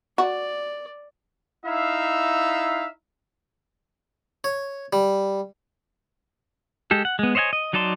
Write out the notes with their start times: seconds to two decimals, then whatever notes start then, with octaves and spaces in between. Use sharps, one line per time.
0.18 F#4 D5
1.66 D#4 E4 E5 F5
4.44 C#5
4.93 G3
6.91 G#3 G4 A4
7.05 F#5
7.19 G#3 B3
7.35 C5 C#5 D#5 F#5 G#5
7.53 D#5
7.73 F#3 D#4 D5 A5 C6